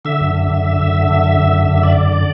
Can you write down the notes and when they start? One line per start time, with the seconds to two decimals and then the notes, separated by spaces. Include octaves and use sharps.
0.05 D3 E5
0.20 F#2
0.35 D3
0.50 F#2
0.65 D3
0.80 F#2
0.94 D3
1.09 F#2
1.24 D3
1.39 F#2
1.53 D3
1.68 F#2
1.83 D3 D5
1.98 F#2
2.13 D3